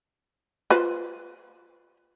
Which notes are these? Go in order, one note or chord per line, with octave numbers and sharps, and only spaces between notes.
F4 B4 C5